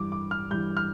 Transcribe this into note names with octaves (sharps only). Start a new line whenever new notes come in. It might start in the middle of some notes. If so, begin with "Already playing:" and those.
Already playing: G2 E3 D6
D6
F6
G2 E3 G6
F6